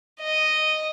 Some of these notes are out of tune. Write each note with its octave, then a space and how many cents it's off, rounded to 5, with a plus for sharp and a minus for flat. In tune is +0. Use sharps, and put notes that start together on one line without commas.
D#5 -5